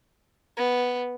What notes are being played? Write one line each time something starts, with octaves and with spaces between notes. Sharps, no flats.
B3